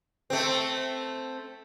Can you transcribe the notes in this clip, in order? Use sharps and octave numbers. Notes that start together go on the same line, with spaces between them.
A3 C4